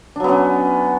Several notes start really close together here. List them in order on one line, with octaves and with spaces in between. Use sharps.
D4 F#3 B3 C#4